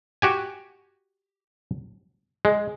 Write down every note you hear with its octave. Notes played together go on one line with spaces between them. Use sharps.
F#4 G4 G#5
G#3